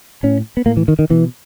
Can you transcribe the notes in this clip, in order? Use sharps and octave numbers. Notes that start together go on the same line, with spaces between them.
A2 C#4
B3
A2 A#3
E3
D#3
D#3
B2 E3